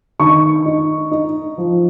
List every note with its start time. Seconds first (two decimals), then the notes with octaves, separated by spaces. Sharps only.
0.19 D#3 C#6
0.65 D#4
1.11 D#4
1.58 F3